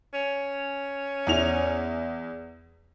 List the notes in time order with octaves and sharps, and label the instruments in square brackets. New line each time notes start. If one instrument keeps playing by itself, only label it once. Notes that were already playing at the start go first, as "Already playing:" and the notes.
[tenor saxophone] C#4
[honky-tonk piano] E2 E4 F7